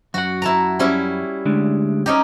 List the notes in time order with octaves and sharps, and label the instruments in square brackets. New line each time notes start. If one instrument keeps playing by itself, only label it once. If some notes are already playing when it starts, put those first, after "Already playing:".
[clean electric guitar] F#2 F#5 [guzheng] F#4
[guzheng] E4 A5 A#5
G3 C#4 E4
[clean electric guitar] D2 G#3 D4
[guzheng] C#4 D#4 G4